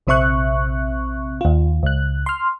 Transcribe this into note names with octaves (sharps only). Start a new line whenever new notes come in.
A#1 C3 C4 E5 C#6 F#6
D#2 F4
C#2 F#6
C6 F6